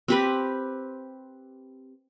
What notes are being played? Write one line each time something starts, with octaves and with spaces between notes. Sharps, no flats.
C4 G4 B4